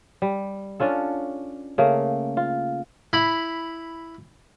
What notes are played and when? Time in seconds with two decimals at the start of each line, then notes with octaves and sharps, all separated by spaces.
0.22 G3
0.80 C#4 D4 F4 A4
1.78 C#3 A3 A#3
2.37 F4
3.13 E4 B5